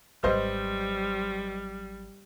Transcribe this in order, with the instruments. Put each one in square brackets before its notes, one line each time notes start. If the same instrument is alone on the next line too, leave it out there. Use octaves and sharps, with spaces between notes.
[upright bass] G#1 F#3 [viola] G3 [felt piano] B4 C5 D#5